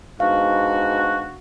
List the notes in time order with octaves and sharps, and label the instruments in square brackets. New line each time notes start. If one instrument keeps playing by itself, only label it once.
[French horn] G#2 [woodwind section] B2 D4 F#4 [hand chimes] F5